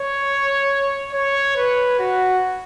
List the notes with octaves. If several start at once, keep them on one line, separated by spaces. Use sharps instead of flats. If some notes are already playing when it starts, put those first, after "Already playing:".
Already playing: C#5
C#5
B4
F#4